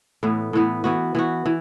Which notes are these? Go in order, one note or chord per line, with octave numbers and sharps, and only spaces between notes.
A2 E3 B3
A2 E3 B3
E3 B3 F#4
E3 B3 F#4
E3